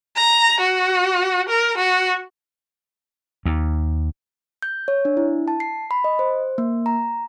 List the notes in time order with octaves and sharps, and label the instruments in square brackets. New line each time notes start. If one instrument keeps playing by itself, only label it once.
[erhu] A#5
F#4
A#4
F#4
[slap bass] D#2
[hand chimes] G6
C#5
D4
E4
A5
C7
B5
D#5
C5
A#3
A#5